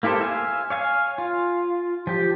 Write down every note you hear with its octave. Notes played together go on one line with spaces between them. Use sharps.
A#3 E4 G4 A4 C5
E5 F5 G#5
C#5 F5 G#5
F4
F3 G4